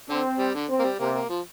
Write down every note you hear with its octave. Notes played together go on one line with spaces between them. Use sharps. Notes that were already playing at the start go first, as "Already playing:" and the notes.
D3 C4
G3
D3
C4
A#3
G3
C3 A#3
A#3
F3